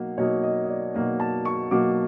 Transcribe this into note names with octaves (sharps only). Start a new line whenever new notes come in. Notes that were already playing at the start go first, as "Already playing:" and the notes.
Already playing: B2 F#3 A#3 D#4
B2 F#3 A#3 D#4 C#5
D#5
D#5
D5
B2 F#3 A#3 D#4 D#5
A5
C#6
B2 F#3 A#3 D#4 D6